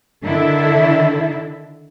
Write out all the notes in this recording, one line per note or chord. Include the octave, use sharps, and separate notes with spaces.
D3 D#3 D4 E4 A4 E5